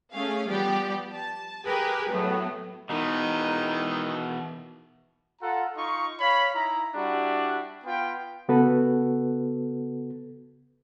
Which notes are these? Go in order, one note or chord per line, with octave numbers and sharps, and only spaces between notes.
A3 C#4 G#4 F5
F3 G3 B3 G4 D5
A5
G4 G#4 A#4 B4 G#5
A2 F#3 A3 B3
B2 D#3 E3 D#4
F4 A4 F#5 A#5
D#4 F4 C#6
C#5 F5 B5
D#4 E4 A#5
G3 D4 E4 F#4
B3 F4 B4 G5
C#3 B3 F#4 A4 B4